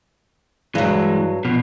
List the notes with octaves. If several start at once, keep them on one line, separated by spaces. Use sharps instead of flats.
G2 E3 F#3 G#3
B2 F3